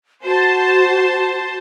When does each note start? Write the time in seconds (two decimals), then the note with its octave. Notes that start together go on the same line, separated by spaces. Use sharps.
0.24 F#4 C5 A5